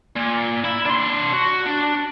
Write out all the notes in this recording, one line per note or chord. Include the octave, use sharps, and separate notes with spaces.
A#2
E4
D4 C6
F#4
D4